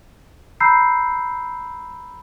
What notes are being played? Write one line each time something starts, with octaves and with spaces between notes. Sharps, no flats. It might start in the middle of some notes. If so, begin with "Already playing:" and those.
A#5 B5 E6 G6 C7